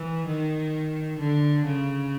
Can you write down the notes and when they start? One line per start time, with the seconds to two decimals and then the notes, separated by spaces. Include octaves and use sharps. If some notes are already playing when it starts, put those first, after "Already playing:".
Already playing: E3
0.26 D#3
1.18 D3
1.65 C#3